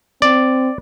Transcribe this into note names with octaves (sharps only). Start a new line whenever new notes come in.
C4 D5